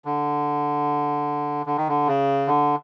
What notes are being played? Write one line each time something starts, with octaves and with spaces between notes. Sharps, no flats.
D3
D3
D#3
D3
C#3
D3